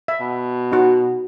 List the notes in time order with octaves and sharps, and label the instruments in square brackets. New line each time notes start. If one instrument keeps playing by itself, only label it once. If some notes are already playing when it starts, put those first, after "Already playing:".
[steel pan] E5
[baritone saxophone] B2
[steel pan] D#4 F#4